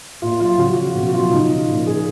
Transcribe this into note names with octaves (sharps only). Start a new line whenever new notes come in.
A#2 F4
F#3 F4
C#3 F#4
F3
B2 F#4
F#3 F4
C#3 D#4
F3
A#2
F3 G#4